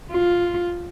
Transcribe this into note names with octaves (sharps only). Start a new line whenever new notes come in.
F4